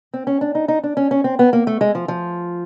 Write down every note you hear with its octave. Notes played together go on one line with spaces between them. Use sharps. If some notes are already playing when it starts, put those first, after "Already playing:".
C4
C#4
D4
D#4
D#4
D4
C#4
C#4
C4
B3
A#3
A3
G#3
F3
F3